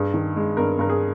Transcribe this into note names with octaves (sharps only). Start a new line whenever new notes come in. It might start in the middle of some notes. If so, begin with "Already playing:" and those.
Already playing: G2 G#4
D#3
G#3
G2 A#4
G2 A#4
G#4